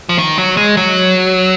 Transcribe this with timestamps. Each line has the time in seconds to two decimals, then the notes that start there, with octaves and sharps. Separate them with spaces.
0.09 F3
0.18 D#3
0.38 F#3
0.57 G#3
0.77 F#3